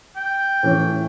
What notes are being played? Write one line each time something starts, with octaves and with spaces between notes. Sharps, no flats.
G5
A2 E3 C#4